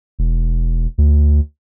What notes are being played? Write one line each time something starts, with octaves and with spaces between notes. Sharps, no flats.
E1
D2